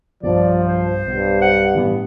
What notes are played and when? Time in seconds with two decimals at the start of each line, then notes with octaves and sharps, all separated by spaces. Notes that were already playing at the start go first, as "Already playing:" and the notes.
0.23 B1 G2 F3 D5
0.67 C5
1.07 B1 G2
1.42 F#5
1.75 A2 E3 G3 B3